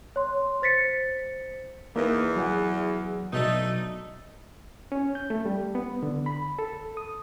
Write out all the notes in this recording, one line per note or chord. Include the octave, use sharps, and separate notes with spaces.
C#5 C6
C5 A6 B6 C#7
E2 A#3 D#4 B4
F#3 G#4 F#5
B2 F#3 A3 D4 D#4
C#4
G6
A3
G3
B3
D3
B5
A4
D#6